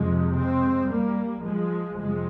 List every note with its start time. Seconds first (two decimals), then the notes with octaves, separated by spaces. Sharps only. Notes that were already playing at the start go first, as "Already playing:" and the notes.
Already playing: F2 C3 F3 G#3
0.34 G#3 C4
0.88 G3 A#3
1.43 F3 G#3
1.98 F2 C3 F3 G#3